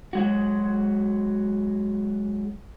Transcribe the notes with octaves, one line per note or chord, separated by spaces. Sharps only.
F#3 G#3 F#4